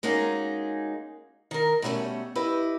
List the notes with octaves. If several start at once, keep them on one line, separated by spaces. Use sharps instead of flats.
G#3 A#3 C#4 D#4 F#4 G#4
D#3 A#4
B2 G3 A3 A#3 C#4
E4 G4 B4 D#5